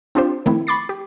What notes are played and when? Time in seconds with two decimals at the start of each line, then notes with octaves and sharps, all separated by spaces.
0.15 C4 D4 F4 G4 C5
0.46 D#3 F3 A3 C4 E4
0.67 B5 C#6 D6 A6 C7
0.89 G4